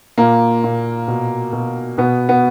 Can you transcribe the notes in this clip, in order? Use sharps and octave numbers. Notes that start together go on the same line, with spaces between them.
A#2 A#3
A#2
B2
B2
B2 B3
B3